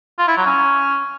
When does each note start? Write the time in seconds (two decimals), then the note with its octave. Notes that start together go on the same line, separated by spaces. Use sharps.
0.19 F4
0.28 E4
0.37 F#3
0.46 C#4